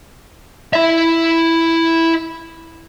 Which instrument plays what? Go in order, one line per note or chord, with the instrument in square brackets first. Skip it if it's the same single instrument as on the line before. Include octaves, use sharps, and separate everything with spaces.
[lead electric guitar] E4 E5